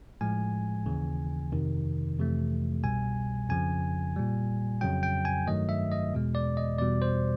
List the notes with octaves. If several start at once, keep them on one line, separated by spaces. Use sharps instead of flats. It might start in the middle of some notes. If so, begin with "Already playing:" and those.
A2 F3 G#3 G#5
D#2 C#3 E3
F2 C3 D#3
F2 C3 E3 A3
C2 B2 G3 G#5
F2 C#3 F3 G#5
A#2 G3
F2 C#3 F#3 G5
G5
G#5
G2 D#3 F#3 A3 D#5
E5
D#5
E2 B2 G#3
D5
D#5
E2 B2 G3 D5
C5